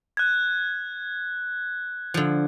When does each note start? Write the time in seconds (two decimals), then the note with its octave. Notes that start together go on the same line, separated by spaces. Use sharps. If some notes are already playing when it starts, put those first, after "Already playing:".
0.17 F#6 G#6
2.14 D3 F3